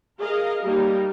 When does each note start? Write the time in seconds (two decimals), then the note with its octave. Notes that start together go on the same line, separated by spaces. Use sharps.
0.19 G#4 A#4 D#5 F5
0.62 G3 A#3 D#4